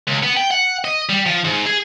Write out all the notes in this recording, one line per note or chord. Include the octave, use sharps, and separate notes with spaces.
C#2
B3
G5
F#5
D#5
G3
F3
G#2
G#4